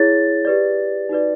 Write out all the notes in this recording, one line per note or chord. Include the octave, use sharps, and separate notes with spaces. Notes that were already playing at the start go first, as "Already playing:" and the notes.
Already playing: E4 G#4 C#5 A6
G4 B4 D5
D#4 F#4 B4 D5